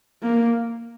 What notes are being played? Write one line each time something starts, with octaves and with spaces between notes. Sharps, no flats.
A#3